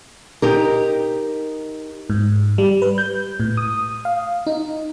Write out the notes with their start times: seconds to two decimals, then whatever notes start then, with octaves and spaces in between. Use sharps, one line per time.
0.42 D#4 G4 A#4
2.10 G#2
2.58 G3
2.82 B4
2.98 G6
3.40 A2
3.57 D#6
4.05 F5
4.47 D#4